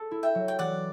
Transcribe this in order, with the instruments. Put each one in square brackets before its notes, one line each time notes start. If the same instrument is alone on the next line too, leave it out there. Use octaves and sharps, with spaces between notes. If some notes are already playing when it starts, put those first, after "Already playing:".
Already playing: [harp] A4
E4
[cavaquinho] E5 G5
[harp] F#3
[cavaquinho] G5
[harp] E3 [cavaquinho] D5 F#5